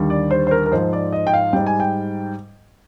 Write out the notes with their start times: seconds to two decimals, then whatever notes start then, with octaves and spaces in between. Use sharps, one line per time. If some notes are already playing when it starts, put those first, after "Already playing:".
Already playing: D#2 D3 G3
0.10 D5
0.31 C5
0.47 C5
0.51 A#4
0.66 A#4
0.72 G#2 F3 C5
0.93 D5
1.12 D#5
1.27 G5
1.33 F5
1.53 G#2 G3 G5
1.66 G#5
1.80 G5